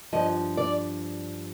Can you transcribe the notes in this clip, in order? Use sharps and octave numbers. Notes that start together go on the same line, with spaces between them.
G2 F3 D#5
D5